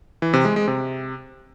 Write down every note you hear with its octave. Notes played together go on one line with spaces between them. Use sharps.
E3
C3
G#3
G#3
C3